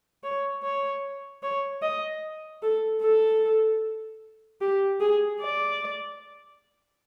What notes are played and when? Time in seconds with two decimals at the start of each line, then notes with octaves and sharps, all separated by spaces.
0.24 C#5
0.63 C#5
1.43 C#5
1.82 D#5
2.63 A4
3.02 A4
4.61 G4
5.00 G#4
5.40 D5